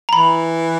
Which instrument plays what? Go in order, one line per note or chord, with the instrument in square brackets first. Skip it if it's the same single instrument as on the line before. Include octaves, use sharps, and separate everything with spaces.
[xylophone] A#5
[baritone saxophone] E3 [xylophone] B5